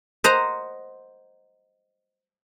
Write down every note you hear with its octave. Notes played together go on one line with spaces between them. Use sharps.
C5 D#5 F#5 A#5